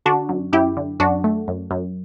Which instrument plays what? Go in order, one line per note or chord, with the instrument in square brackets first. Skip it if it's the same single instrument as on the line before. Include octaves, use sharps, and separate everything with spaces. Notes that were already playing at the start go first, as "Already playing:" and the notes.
[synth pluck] D3 D4 F#4
F#2
F#2 E4 G4
D3
F#2 D4 F#4
A3
F#2
F#2